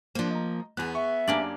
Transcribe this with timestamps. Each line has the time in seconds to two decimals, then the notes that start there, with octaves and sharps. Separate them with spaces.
0.15 F3 A#3 D4 C5
0.31 D#5 A#5
0.77 E2 B3 G#4 F#6
0.95 E5 C#6
1.28 F#2 A#3 D4 G4 D5 G#5